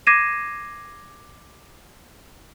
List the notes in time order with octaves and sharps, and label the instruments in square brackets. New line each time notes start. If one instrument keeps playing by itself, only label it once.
[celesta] D6 G#6 A#6 C7 D#7 E7